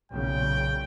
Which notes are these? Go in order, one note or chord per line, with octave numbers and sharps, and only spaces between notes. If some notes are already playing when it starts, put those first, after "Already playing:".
B1 A#2 C#3 G5